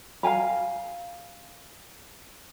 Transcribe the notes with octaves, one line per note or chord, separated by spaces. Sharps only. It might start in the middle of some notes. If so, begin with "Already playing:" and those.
F5 G5 G#5 A#5